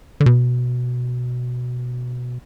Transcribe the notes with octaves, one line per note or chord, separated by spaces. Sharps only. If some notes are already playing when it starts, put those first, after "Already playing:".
D3
B2